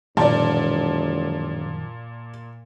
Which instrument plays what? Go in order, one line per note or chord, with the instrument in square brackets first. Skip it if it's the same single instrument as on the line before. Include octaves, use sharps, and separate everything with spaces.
[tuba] E1 [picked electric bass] F#2 D#3 F3 [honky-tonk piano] A#2 [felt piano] D5 A5